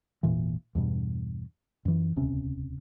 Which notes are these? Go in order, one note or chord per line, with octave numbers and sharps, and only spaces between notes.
G#1 E2 A#2 E3
E2 G2 B2
F#2 E3
D#1 C#2 C3 C#4